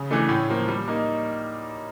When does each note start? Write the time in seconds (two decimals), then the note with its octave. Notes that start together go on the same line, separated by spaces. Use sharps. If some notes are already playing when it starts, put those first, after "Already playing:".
Already playing: C#3
0.10 E3 A3 D4
0.29 A2
0.49 F3 A#3
0.68 G3
0.88 A#3 D#4